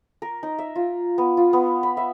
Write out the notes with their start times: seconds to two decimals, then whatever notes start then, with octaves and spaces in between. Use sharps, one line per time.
0.22 A#4
0.43 D#4
0.59 E5
0.76 F4
1.18 B3
1.37 F4
1.53 B3
1.83 B5
1.97 E5